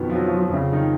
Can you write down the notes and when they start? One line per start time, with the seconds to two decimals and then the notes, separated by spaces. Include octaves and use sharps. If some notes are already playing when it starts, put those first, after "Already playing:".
Already playing: F2 B2 D#3 B3
0.10 F3
0.15 F#3
0.27 F3
0.38 F3
0.49 F2 C#3
0.72 D#3 D#4